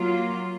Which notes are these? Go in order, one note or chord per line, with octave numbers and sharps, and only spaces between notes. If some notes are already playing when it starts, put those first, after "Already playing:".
Already playing: F#3 A#3 F4